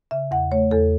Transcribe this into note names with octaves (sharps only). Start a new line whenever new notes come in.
C#3 E5
E2 F#5
A3 C#5
E2 A4